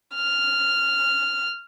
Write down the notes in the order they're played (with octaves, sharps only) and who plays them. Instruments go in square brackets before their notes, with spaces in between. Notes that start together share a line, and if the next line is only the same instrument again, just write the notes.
[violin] F6